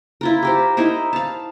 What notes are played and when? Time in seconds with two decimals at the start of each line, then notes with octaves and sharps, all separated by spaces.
0.21 E4 F4 A#4
0.43 G4 A#4 C5
0.77 D#4 E4 A#4 C5
1.13 F5 A5